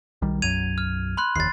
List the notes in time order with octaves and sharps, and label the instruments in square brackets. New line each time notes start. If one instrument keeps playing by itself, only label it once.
[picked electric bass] B1 D#3 G3
[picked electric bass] B1 F#2 F#3 [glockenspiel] G#6 D#7 F7
[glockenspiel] F6
B5 C6 F#6
[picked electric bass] F1 D#2 [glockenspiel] A6 C7